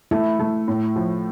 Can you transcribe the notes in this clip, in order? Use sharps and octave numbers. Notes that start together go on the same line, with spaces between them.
A3 E4
A3
A2
F3